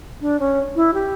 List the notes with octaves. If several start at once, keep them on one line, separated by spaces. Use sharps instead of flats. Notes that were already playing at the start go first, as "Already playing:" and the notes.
D4
C#4
E4
G4